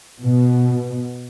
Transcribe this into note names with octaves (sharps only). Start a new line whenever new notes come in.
B2